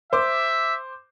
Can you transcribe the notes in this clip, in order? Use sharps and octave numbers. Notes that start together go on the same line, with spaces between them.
C5 E5 D6